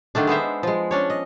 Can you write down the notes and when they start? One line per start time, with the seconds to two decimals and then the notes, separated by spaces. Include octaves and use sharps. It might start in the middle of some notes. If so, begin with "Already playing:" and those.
0.15 D3 D#3 A3 D4
0.27 G#3 B3 C5 E5
0.63 F3 G#3
0.91 C#4 D4 C#5
1.10 D#5